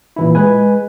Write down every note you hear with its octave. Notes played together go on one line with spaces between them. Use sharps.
A#2 E3 E4
G#3 B4 G#5